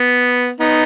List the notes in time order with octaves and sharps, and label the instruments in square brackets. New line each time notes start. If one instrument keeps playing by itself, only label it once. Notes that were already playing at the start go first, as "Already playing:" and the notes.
Already playing: [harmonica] B3
B3 D#4